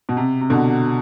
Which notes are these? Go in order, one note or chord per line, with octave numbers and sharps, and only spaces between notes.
B2
C3
C3
B2 D3